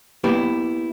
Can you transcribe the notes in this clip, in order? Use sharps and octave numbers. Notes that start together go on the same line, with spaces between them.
A#3 B3 E4 G4 B4